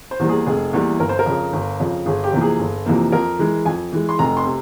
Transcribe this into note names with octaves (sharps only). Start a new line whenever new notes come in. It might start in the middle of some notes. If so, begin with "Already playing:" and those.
C5
E2 E3 G3 A#3
G#4
F1 G#4
E2 E3 G3 A#3
G1 A#4
C5
A#4
F2 C#3
G1
F2 C#3
G1 G#4
G4
F2 C3 E3 A#3
G#4
G1
F2 C3 E3 A#3
F2 A#4
E3 G#3
F2 G#5
E3 G#3
C6
F1 A#5
C6
C3